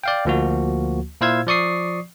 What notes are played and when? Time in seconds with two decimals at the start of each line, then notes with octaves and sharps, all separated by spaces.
0.04 D5 F5 G5
0.25 D2 F3 A#3 F#4
1.21 A#2 E4 C5 F5 E6 G#6
1.47 F3 D5 C#6 D#6 C7